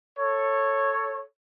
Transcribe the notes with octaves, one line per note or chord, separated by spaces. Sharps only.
A4 C#5